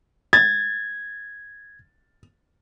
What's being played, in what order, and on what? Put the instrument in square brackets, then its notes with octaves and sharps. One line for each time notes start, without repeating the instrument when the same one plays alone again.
[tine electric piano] G#6 [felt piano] A6